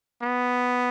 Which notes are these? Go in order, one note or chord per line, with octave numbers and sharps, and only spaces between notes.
B3